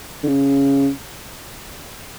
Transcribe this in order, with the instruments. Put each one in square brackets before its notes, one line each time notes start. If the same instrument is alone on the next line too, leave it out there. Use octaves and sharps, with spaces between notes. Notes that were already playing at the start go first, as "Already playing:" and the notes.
[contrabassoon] D3
C#3